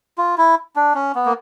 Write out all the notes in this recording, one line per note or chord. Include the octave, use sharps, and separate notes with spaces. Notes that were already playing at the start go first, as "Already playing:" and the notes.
F4
E4
D4
C#4
B3
A#3